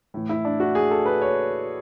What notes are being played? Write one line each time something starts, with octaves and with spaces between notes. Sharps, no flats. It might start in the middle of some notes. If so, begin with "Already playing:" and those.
A2 E3
E4
D4
F#4
G#4
A4
B4
C#5